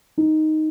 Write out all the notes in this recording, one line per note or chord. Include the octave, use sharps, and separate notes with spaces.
D#4